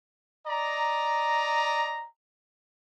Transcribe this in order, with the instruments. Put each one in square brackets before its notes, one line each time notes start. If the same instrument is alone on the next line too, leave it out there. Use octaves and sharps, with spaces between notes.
[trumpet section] D5 D#5 A#5